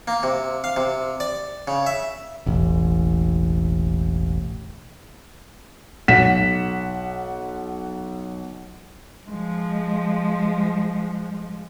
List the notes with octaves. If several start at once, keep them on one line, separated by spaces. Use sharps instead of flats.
A#3
C3
F5
C3
D5
C#3
E5
E1 A1
B1 F#5 B6 E7
F3 G#3